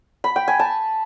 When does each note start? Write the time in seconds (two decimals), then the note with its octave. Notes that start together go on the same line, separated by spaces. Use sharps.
0.24 B5
0.36 G5
0.48 G#5
0.59 A5